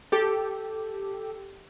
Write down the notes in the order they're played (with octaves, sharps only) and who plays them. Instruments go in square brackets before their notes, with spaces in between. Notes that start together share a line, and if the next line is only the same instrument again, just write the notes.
[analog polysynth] G4 A4